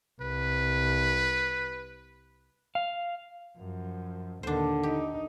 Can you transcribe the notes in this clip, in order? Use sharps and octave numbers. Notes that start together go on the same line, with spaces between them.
C2 B4
F5
F#2 F3
D#2 A#2 D3 D4 C5
D#4 G4